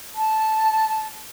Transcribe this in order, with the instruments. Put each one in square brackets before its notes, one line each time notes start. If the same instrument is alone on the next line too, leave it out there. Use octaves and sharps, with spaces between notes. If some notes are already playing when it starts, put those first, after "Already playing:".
[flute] A5